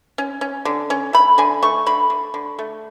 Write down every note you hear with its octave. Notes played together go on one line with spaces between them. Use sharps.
C#4
C#4
D3
C#4
A3 B5
D3 G#5
A3 C#6
D3 B5
D3
D3
A3